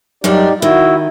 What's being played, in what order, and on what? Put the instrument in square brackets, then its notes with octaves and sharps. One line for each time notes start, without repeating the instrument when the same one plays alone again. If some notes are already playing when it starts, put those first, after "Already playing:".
[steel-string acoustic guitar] F#2 G3 D4 [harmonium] D#4 G4 D5
[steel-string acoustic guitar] D#3 [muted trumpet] E4 [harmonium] F#4